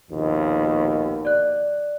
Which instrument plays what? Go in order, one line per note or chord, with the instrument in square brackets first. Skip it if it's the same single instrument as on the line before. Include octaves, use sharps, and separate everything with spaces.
[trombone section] A#1 D#2 B2
[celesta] D5 F#6